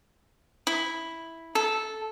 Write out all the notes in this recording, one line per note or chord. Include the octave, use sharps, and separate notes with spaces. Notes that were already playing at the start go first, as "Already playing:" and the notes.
E4
A4